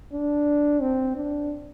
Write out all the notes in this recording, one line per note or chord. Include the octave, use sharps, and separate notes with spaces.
D4
C4
D4